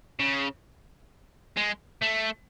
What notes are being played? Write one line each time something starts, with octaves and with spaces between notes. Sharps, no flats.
C#3
G#3
A3